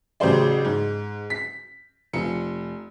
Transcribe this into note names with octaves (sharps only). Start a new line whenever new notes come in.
A1 C#3 F#3 G4 C5 D5
G#2
B6
F1 F3 C#7